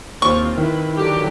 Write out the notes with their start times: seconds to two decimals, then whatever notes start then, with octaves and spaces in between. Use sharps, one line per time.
0.22 D#2 C4 F4 C#6
0.57 D#3 E4 B4
0.96 D3 E3 F#3 G4